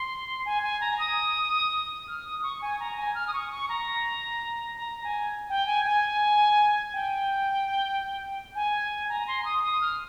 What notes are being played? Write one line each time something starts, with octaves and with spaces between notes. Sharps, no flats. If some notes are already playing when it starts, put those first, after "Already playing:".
Already playing: C6
G#5
G#5
A#5
D#6
F6
D#6
C#6
G#5
A#5
G#5
F6
D#6
C#6
C#6
A#5
A#5
G#5
G5
G#5
G#5
G5
G#5
A#5
C6
D#6
D#6
F6